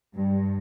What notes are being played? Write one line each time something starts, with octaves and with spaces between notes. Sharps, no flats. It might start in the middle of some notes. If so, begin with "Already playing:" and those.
G2